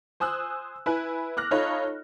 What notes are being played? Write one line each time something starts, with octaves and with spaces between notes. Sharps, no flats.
C5 G#5 D#6 E6 F#6
E4 B4 G#5 F#6
D6 F6 F#6 A#6
D#4 F4 A4 C#5 D#5 B5